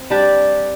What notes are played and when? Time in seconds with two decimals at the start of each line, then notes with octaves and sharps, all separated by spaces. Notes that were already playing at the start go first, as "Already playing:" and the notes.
Already playing: C4
0.10 G3 D4 G4 D5